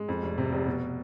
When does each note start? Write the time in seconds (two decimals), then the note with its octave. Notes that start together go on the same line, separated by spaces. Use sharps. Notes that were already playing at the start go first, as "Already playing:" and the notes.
Already playing: G#3
0.09 F2
0.23 F1
0.38 C3
0.52 F1
0.67 B2